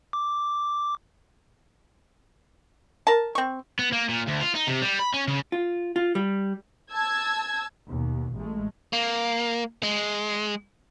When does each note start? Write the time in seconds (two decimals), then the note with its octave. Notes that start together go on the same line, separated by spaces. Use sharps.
0.13 D6
3.07 A#4 A5
3.35 C4 C#6
3.79 B3
3.92 A#3
4.09 A#2
4.27 D2
4.41 F4
4.55 D#4
4.67 C3
4.82 G3
4.99 B5
5.14 C#4
5.28 C#3
5.52 F4
5.96 F4
6.15 G3
6.92 A5 E6 G#6
7.89 D#2 B2
8.35 A1 G#3 A3
8.93 A#3
9.83 G#3